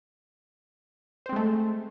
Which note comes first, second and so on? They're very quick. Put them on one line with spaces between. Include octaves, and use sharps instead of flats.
C5 C4 G#3 A3